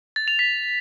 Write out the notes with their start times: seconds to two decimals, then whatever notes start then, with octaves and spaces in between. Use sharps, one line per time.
0.16 A6
0.28 F7
0.39 B6